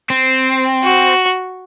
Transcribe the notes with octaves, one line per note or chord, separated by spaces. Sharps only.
C4
F#4